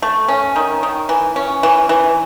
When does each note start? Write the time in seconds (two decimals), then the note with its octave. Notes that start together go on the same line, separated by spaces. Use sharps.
0.02 A3
0.28 C#4
0.56 D#3
0.83 D#3
1.09 E3
1.36 C#4
1.63 E3
1.89 E3